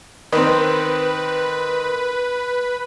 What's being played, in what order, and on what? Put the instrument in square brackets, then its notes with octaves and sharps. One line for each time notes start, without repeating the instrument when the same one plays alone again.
[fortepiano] D#3 C4 [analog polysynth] B4